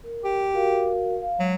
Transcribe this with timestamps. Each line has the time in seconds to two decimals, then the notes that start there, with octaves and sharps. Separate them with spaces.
0.04 A#4
0.24 G4
0.54 F#4 A#4 F5
1.22 F5
1.39 F#3 G#3